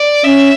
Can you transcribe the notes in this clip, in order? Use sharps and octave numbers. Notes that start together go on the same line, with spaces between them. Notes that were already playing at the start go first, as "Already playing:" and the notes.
Already playing: D5
C#4 E5